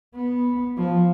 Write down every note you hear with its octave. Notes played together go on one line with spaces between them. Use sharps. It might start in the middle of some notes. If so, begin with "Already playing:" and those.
B3
F3